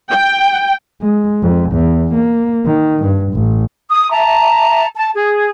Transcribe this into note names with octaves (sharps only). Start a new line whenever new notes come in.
G5
G#3
F2
E2
A#3
D#3
G2
A1
D#6
E5 A5 A#5
A5
G#4